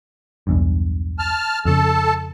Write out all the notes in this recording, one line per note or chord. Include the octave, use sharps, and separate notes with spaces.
B1 E2 G2
A5 F6
F2 C#3 A4 A5